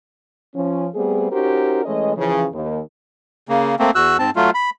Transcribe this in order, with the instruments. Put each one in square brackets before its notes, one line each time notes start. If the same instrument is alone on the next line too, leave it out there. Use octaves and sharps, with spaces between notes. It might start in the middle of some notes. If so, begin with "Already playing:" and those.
[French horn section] F3 C#4
G3 A3 B3 C4 G#4
C#4 D#4 F#4 G4 A#4 C5
E3 G#3 A3 C#4 D#5
C#3 E3 F3
D#2
[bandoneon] C#3 A#3
A3 A#3 C4
E2 F#4 E6 F#6
G#2 C4 A5
F#3 A3 F4
B5